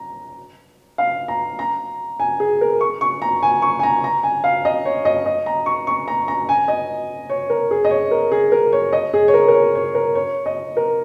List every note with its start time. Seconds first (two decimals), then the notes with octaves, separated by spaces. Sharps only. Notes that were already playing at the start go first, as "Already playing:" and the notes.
Already playing: A#5
0.98 F5
1.28 A#5
1.59 A#5
2.20 G#5
2.40 G#4
2.61 A#4
2.81 C#6
3.01 C#6
3.22 A#5
3.43 G#5
3.62 C#6
3.79 G#5
3.83 A#5
4.04 A#5
4.23 G#5
4.44 F5
4.65 D#5
4.85 C#5
5.05 D#5
5.26 D#5
5.46 A#5
5.66 C#6
5.87 C#6
6.08 A#5
6.28 A#5
6.49 G#5
6.68 D#5
7.30 C#5
7.50 A#4
7.71 G#4
7.85 D#5
7.91 C#5
8.11 A#4
8.31 G#4
8.52 A#4
8.73 C#5
8.93 D#5
9.14 G#4
9.28 C#5
9.34 A#4
9.48 A#4
9.54 C#5
9.75 C#5
9.95 A#4
10.15 C#5
10.46 D#5
10.77 A#4